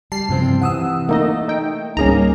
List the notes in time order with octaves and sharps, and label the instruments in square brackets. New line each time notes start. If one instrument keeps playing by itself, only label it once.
[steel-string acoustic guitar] G3 [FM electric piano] A5 [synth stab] C7
[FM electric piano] G2 C3 [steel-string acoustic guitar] E3 F3 C4
[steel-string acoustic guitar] C3 E3 [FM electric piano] F#5 D#6 E6
[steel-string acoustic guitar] A3 [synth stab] A#3 D#4 D#5
[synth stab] D#4 G5
[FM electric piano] C#2 G3 [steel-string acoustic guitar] G#2 A#3 D#4 [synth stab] C#4 G#4 A#5